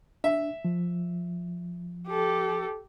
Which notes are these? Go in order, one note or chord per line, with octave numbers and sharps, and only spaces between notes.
D4 E5
F3
G4 A4